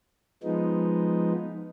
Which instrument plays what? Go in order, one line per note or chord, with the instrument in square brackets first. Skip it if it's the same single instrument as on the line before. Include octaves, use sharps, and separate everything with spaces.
[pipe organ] F3 G#3 B3 D#4